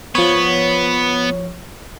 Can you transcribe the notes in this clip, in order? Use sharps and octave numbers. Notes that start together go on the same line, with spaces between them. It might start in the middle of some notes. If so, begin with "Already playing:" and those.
F3 B3 C#5